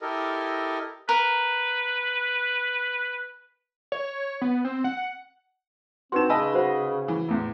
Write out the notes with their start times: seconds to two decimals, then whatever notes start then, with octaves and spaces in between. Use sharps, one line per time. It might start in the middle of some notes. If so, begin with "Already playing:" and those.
0.01 E4 G4 A4 A#4 D#5
1.09 A#4 B4
3.92 C#5
4.41 B3
4.65 C4
4.84 F#5
6.12 C4 D#4 F#4 B4 C6 E7
6.29 C#3 B4 D#5 G#5 A5 E6
6.54 F#4 C5 F#5
7.08 E3
7.28 A1 E2